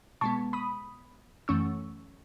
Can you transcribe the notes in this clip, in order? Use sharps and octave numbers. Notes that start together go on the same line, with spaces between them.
B2 G#3 B3 A5 C#6
B5 D#6
F#2 E3 A3 C#4 C#6 E6